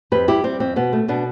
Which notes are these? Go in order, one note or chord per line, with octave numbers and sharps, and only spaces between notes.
F2 G4 B4
G3 E4 G4
G3 C4
F2 C4
B2 B3
A3
B2 B3 D4